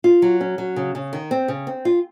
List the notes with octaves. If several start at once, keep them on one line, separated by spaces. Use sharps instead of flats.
F4
F#3
C#4
F#3
C#3
C#3
D#3
C4
C#3
C4
F4